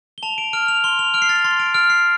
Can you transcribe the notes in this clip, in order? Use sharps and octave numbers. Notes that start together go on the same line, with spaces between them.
G7
A5 F7
D7
F6 D7
F7
C6 G7
F7
F6 D7
C7
A6
C6 A6
D7
F6 D7
C7